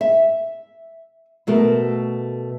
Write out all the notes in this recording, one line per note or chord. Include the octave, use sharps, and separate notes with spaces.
E5
B2 A3 F#4 A#4